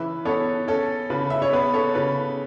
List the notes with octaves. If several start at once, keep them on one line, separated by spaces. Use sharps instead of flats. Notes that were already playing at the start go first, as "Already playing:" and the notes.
Already playing: C#3 E3 B4 E5
B3 A4 C#5
C#4 A4
C#3 B4
E5
C#5
B3 B4
A4 C#5
C#3 B4